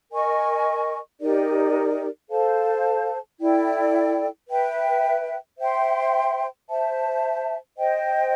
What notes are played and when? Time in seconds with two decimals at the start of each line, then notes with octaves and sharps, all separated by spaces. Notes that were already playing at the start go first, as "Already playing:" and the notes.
0.11 A#4 D#5 G#5 C#6
1.20 D#4 G4 A#4 D5
2.30 A4 C5 F5 A5
3.40 E4 A4 D5 G5
4.48 B4 E5 G5
5.59 C5 E5 G5 C6
6.68 C5 E5 A5
7.77 C5 D#5 G5